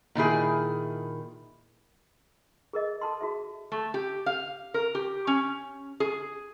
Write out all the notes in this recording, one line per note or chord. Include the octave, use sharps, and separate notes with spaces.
A#2 D#3 E4 G#4
G#4 A#4 D#5
A4 A5 C6
F#4 G#4 E5
A3
G4
F5
A#4
G4
C#4
G#4